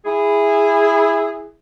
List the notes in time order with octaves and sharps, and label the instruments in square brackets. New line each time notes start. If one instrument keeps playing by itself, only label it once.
[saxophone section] E4 G#4